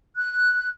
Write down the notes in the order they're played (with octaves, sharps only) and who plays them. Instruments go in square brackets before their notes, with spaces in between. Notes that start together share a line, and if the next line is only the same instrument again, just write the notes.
[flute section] F#6